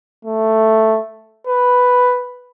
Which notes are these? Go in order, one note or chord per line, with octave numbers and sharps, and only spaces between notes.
A3
B4